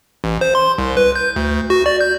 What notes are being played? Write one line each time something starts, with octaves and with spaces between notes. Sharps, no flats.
A1
C5
C6
C2
B4
G6
D2
F#4
D5
G6